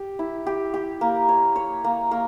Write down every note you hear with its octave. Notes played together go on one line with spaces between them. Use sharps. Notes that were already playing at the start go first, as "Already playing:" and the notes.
Already playing: G4
E4
G4
G4
A#3
C#5
C#5
A#3
A#3